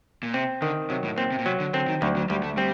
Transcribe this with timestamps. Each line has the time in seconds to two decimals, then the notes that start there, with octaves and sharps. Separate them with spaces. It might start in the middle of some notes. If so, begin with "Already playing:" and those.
0.23 A#2
0.34 C3 C4
0.62 D3 D#3
0.90 C3 F#3
1.04 A2
1.18 A#2 C4
1.32 C3
1.38 A#2
1.46 C3 F#3
1.60 D3
1.74 D3 C4
1.88 D#3
2.02 D2 F#3
2.16 F#3
2.30 D2 G3
2.43 A3
2.57 G3 C4